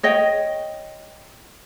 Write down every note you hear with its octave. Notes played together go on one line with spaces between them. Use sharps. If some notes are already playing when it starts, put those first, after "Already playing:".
C#5 D#5 G5